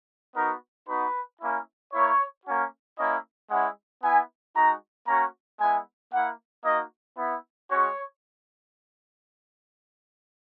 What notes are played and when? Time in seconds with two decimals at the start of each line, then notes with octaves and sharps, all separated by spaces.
0.36 B3 D#4 F#4 A#4
0.88 B3 D#4 F#4 B4
1.41 A#3 C#4 E4
1.93 A#3 E4 C#5
2.46 A#3 C#4 F#4
2.98 A#3 C#4 E4 D#5
3.51 G#3 C#4 E4 F#5
4.03 B3 E4 G#5
4.55 G#3 D#4 F#4 A#5
5.07 A#3 C#4 F#4 A#5
5.60 G#3 B3 E4 G#5
6.12 A#3 E4 F#5
6.65 A#3 D#4 F#4 D#5
7.18 B3 E4
7.70 G#3 C#4 F#4 C#5